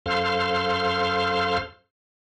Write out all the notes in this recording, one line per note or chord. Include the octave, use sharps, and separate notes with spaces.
F#2 A4 C5 F5 C6 F6